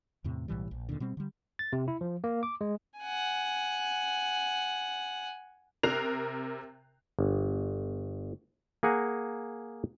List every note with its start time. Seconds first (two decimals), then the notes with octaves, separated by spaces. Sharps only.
0.24 E2 A2 C3
0.48 B1 A2 E3 G3
0.71 A#1
0.89 D#2 A#2 D3
1.00 B2 G3 C4
1.17 D3 G3
1.59 A6
1.73 C3
1.88 E4
2.01 F3
2.24 A#3
2.43 D6
2.61 G#3
2.99 F#5 G#5
5.83 C3 A#4 A#5 F#6 C7 F7
7.19 G1
8.83 A#3 G#4 F#5 G#5 A#5